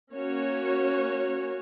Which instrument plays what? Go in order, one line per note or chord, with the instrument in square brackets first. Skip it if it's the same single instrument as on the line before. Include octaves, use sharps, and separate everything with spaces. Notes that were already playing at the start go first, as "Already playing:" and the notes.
[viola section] A#3 C#4 F#4 C#5